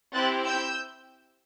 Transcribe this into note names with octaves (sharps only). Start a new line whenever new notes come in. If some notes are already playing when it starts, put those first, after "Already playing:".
C4 E4 G4 F#6 A6
E6 G6